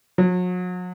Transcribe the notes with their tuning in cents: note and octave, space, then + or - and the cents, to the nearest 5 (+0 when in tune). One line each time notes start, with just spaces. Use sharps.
F#3 -40